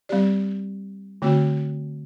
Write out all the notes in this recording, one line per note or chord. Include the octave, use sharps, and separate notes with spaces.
G3 C4 G4 D5
D3 A3 C4 F#4